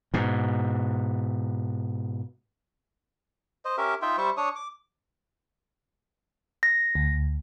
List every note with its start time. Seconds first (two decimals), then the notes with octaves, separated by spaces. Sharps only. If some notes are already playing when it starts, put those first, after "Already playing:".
0.14 G#2 B2
3.65 C5 D#5
3.78 C#4 G4 A#4 E5
4.02 D#4 F4 E5 G5
4.18 G3 C5 E5 C#6
4.37 D4 C#5 C#6 D#6
4.56 D6
6.63 A#6
6.95 D2